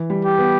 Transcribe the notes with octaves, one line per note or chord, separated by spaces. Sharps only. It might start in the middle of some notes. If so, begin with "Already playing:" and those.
Already playing: E3
G3
G4
B3